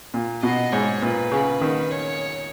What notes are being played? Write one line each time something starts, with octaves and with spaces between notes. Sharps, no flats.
A#2
B2 D#5
G#2 C#5
A#2 B4
C#3
D#3
C#5